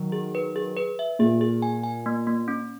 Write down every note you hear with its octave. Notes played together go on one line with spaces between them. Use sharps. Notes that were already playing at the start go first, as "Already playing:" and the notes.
Already playing: D#3 F#3
G#4
B4
G#4
B4
E5
A#2 G#4
G#4
G#5
G#5
A#3
A#3
C#4